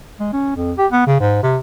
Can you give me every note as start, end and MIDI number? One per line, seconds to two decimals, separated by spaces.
0.20 0.30 56
0.33 0.52 61
0.56 0.73 41
0.78 0.87 67
0.92 1.02 59
1.07 1.17 49
1.20 1.42 44
1.43 1.57 48